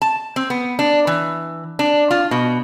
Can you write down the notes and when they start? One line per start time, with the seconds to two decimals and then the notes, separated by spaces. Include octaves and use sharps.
0.02 A5
0.36 C4
0.50 B3
0.79 D4
1.07 E3
1.79 D4
2.11 F4
2.31 B2